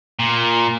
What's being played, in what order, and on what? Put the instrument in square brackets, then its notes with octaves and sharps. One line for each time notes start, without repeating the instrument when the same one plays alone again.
[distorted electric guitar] A#2